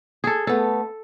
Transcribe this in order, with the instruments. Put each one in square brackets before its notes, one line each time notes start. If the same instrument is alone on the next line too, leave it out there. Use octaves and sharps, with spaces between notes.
[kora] G#4 A4
[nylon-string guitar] A3 B3 [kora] A4